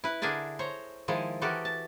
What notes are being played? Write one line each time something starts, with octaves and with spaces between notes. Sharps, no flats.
E4 B4
D3 D4 G#4 A#4 E5 A5
C5 C#5 A#5
D#3 F3 G#3 E4
E3 G#3 F#4 G4 A4 A#4
A5